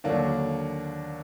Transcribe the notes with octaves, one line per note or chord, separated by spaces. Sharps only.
D#2 D3 F#3 A#3 D4